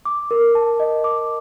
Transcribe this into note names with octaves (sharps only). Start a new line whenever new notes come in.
D6
A#4
A5
D#5
D6